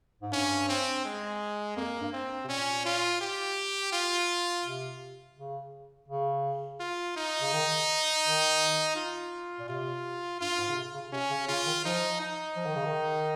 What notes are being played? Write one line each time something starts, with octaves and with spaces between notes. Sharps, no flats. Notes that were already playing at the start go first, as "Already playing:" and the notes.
G#2
G2 C#4
C4
G#3
F2 A#3
G2
C4
C3
A#2 C#4
F4
G4
F4
C3
C#3
C#3
F4
D#4
C#3
D#3
D#3
F4
A#2
C3 F4
G2 F4
G#2
C#3
C3
C#3
C3 C#4
C#3
C#3 F4
D#3
F3 D#4
D#4
F3
D#3
C#3
D#3